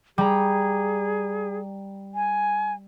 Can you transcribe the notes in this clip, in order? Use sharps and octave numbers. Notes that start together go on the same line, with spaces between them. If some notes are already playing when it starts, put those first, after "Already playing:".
G3 G#4 A#5
G#5